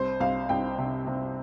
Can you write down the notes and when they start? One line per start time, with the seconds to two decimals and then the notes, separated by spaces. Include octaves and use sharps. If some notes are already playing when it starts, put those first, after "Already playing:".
Already playing: C2 C5
0.20 C2 F5
0.49 C2 G5
0.78 C3
1.07 C3